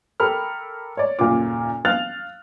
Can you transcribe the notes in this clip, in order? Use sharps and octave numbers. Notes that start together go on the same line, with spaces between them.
G4 A4 A#4 B5 F6
C#5 D5
D#1 F#2 A#2 C#3 F4 D6
F5 F6 F#6 A6 F7